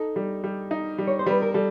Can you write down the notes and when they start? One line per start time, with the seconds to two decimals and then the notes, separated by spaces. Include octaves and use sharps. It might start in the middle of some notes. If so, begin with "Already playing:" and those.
Already playing: D#4 A4
0.16 G3
0.44 G3
0.71 D#4
0.98 G3
1.07 C#5
1.19 C5
1.26 G3 B4
1.42 A#4
1.54 G3 A4